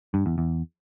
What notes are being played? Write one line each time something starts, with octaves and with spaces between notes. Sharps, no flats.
G2
E2
E2